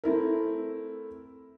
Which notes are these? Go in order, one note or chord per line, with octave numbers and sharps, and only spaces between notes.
A3 C4 E4 A#4